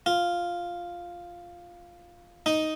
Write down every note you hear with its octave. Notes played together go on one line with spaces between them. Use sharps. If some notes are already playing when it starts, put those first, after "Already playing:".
F4
D#4